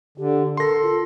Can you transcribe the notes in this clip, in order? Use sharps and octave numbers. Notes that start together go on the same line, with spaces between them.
D3 G4
A4 A#4 C6 A#6
F4